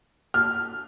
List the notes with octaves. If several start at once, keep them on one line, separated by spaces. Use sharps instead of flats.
F6